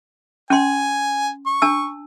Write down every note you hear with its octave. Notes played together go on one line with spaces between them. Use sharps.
C#4 G#5 C6
C#6
D4 A5 E6